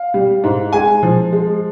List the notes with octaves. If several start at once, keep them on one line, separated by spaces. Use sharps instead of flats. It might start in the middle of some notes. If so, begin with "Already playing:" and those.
Already playing: F5
G3
G#2
G#3 G#5
F3
G#3